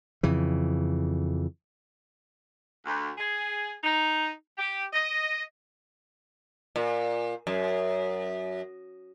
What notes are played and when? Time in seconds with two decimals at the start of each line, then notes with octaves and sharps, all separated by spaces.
0.23 F2 C#3 E3
2.86 D2
3.18 G#4
3.84 D#4
4.58 G4
4.93 D#5
6.76 A#2
7.47 F#2